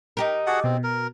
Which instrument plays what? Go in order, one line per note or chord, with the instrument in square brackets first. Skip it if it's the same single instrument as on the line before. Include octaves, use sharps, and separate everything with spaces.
[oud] D#4 G4 A#4
[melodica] F#4 G#4 F#5 [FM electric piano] A4 D5 A5
[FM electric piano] B2 [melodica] C4
[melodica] A#4